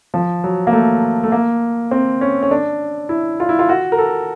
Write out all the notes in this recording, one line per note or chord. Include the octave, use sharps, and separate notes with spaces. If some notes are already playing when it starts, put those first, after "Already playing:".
F3
F#3
A#3
A3
A3
A#3
C4
C#4
C#4
D4
E4
F4
E4
F4
F#4
A#4
A4